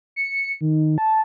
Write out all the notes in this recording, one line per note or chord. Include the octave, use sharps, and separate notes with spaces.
C#7
D#3
A5